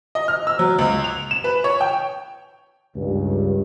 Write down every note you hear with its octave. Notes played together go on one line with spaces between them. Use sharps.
D#5
F6
E6
F#3
C#2
F7
E7
B4
C#5
G5
C#2 G2 D#3